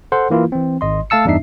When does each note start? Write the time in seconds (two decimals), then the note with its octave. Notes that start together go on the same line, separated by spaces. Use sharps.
0.12 A4 C5 F#5 C6
0.30 E3 A#3 E4 F4
0.52 E3 C4
0.81 G#1 D#5 C6
1.10 A3 F5 A5 E6 C#7
1.25 E2 G2 D4 D#4 E5 C7